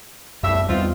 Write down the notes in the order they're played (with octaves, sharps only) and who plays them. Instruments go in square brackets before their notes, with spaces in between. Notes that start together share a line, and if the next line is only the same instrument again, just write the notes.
[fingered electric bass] C2 F#2 [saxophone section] A2 G3 E5
[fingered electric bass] E2 G3 [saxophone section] C4 D#4 F4